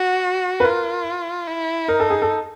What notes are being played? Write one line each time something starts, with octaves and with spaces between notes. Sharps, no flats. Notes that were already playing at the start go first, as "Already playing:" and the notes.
Already playing: F#4
B4
F4 A#4
E4
D#4 A#4
A4
G#4
A4